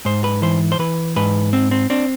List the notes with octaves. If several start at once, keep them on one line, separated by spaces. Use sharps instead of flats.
G#2 C5
B4
E3 C5
C5
E3 B4
G#2 B4
C4
C4
C4 D4